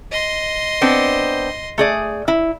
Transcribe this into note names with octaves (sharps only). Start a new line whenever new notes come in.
D#5 C6
B3 C4 D4
A3 G#4 D5
E4